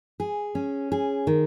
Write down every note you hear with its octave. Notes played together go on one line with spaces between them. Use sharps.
G#4
C#4
G#4
D#3